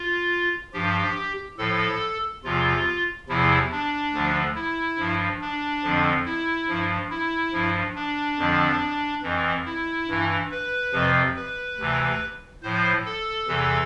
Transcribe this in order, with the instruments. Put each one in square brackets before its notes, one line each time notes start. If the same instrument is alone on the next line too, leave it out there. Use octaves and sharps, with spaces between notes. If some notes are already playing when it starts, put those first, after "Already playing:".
Already playing: [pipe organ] F4
G2 F3 G4
A2 F3 A4
E2 C3 F3 F4
E2 C3 F3 E4
D4
D2 D3 F3
E4
G2 F3
D4
F2 D3 F3
E4
G2 F3
E4
G2 F3
D4
F2 D3 F3
F2 E3
E4
G2 E3
B4
F2 C3 F3
B4
D2 C3 E3
A2 F3 C5
A4
E2 C3 E3